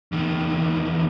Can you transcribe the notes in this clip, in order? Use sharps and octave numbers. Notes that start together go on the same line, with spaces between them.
E2 D#3